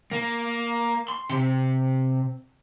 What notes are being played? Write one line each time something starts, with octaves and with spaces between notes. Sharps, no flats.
A#3
C6
C3